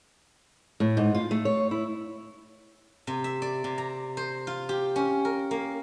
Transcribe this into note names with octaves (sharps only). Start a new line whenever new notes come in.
A2
G#2
F4
A3
C#5
E4
C3
E5
D5
C3
A#5
C5
F4
G4
C#4
A#4
A#3